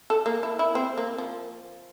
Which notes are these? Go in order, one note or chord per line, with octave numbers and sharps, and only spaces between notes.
A4
A#3
E4
E4
C4
A#3
F3